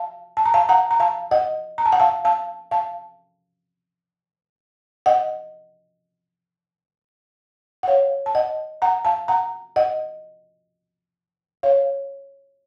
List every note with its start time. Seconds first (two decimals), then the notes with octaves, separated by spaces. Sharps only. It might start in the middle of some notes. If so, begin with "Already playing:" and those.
Already playing: F5 A5
0.37 A5
0.45 A#5
0.54 F5 A5
0.69 F#5 A#5
0.91 A#5
1.00 F5 A5
1.31 D#5 F#5
1.78 A#5
1.86 A5
1.92 F#5
2.00 F5 A5
2.25 F5 A5
2.71 F5 A5
5.06 D#5 F#5
7.83 F#5
7.88 C#5 F5
8.26 A5
8.35 D#5 F#5
8.82 F#5 A#5
9.05 F5 A5
9.28 F#5 A#5
9.76 D#5 F#5
11.63 C#5 F5